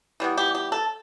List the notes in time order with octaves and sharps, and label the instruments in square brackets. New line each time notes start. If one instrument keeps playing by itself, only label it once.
[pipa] E3 G3 B3
G4
G4
A4